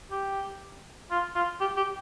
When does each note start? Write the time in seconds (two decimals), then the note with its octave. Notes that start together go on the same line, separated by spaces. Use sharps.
0.11 G4
1.11 F4
1.35 F4
1.60 G4
1.77 G4